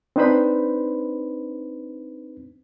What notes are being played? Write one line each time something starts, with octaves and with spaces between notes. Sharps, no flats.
C4 D4 D#4 B4 C5 B5